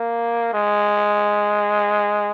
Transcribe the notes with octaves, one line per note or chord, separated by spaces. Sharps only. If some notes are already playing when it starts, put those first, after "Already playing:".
Already playing: A#3
G#3